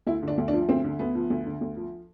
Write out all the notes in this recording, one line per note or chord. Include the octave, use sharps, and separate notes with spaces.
D2 E4
D3
D4
D2
D4
F3
D2 C4
D3
D2 B3
F3
D2
D3
D2
F3